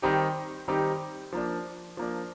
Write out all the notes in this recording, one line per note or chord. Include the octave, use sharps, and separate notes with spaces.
D#3 G3 C4 D#4 G4
D#3 G3 C4 D#4 G4
F3 A#3 D4
F3 A#3 D4